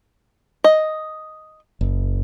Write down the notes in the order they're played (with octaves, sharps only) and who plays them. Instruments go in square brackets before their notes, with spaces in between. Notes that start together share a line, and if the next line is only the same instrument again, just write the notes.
[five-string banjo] D#5
[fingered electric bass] F#1